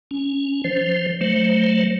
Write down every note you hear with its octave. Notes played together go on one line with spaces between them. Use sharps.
C#4
F3 C5
F#3 A3 C5